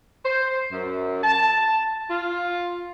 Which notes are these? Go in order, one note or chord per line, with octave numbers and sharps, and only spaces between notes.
C5
F#2
A5
F4